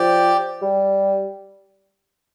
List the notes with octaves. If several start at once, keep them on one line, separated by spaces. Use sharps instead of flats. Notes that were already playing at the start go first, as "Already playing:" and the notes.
Already playing: F3 G4 D5 G5
G3